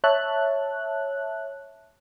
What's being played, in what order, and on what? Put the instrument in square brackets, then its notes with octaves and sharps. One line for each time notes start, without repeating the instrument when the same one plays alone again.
[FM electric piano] C#5 E5 A5 F#6